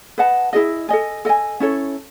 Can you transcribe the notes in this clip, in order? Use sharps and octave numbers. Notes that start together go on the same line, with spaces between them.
B4 D#5 F#5 A5
E4 G#4 B4 D#5
A4 D#5 G#5
A4 D#5 G#5
C#4 E4 A4 C#5